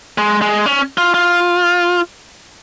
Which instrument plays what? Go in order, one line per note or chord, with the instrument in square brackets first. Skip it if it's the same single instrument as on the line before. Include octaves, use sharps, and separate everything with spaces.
[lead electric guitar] G#3
G#3
C#4
F4
F4